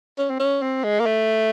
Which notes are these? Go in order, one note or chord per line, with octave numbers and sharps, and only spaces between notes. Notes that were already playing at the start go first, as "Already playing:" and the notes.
C#4
C4
C#4
C4
G#3
A#3
A3